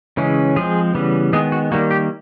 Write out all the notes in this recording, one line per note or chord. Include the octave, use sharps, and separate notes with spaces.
C#3 E3 G#3 C#4
F3 G#3 C4 G#4
C#3 E3 G3 B3
D#3 G#3 B3 G#4
F#4
D#3 G3 A#3 F#4
G4